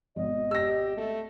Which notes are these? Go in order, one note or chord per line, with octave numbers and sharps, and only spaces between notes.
G#1 B2 D#5
G4 E6 A#6
A3